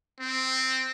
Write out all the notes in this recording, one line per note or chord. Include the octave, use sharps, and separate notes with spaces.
C4